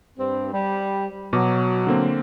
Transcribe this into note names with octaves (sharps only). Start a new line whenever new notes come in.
G2 C4
G3
B2 F#3 D6
D3 A#3 C4